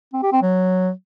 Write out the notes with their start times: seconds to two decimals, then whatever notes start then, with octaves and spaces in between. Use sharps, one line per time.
0.13 C4
0.23 G4
0.33 C4
0.42 F#3